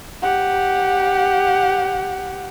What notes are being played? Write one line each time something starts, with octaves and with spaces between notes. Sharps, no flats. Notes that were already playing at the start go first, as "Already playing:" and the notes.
G4 F#5